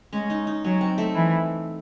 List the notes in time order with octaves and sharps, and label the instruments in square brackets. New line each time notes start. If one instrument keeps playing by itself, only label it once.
[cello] G#3 [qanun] C#4
[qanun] D#4
D#4
[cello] F#3 [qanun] C#4
[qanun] C4
A3
[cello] E3